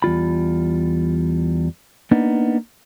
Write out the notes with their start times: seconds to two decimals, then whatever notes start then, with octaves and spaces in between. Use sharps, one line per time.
0.02 E2 G3 F4 B5
2.11 A#3 B3 D4 D#4